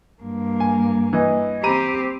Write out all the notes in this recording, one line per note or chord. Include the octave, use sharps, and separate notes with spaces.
G2 A#3
G#5
E3 D#5
C4 G4 A#5 B5 D#7